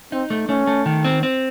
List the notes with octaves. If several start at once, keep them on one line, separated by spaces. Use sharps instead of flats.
C4 D#4
A3
A3 C#4
A3
D#3
C4
C4